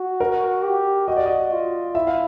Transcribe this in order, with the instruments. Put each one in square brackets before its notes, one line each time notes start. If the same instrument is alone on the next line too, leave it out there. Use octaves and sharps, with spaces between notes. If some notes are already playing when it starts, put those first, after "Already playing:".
Already playing: [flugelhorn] F#4
[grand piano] A#4
[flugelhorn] G4
[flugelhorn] F#4 [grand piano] D#5
[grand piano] D5
D#5
[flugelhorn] F4
[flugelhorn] E4 [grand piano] E5
[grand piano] F5